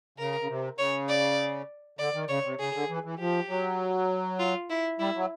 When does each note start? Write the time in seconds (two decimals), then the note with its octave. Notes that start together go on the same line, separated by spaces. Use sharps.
0.18 C#3 A#4
0.41 C#3
0.48 C3
0.78 C#3 C#5
1.09 D5
1.98 D3 D5
2.14 D#3
2.28 C#3 C#5
2.44 C3
2.59 C#3 G#4
2.74 D3
2.89 E3
3.04 E3
3.19 F3 G4
3.49 F#3
4.39 F4
4.70 E4
4.99 G3 E4
5.15 F#3